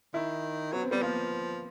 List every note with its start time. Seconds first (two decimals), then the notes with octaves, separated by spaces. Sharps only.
0.14 D#3 E4
0.72 F#3 B3
0.82 C4
0.91 G3 B3
1.02 F3 A#3